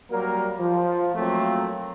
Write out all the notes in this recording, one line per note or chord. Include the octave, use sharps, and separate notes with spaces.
F#3 G3 A#3 A#4
F3
F3 F#3 A3 A#3 C4